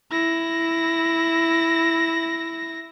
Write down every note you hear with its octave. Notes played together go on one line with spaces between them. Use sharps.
E4 A#6